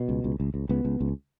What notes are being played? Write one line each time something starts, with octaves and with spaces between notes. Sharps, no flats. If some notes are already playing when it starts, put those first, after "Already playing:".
Already playing: B2
C#2
C#2
C#2
C#2
C#2 B3
C#2
C#2